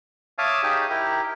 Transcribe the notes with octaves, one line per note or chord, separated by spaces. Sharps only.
C#5 E5 F5 A5 D6 D#6
D#4 G4 G#4 C#5
E4 G4 A#4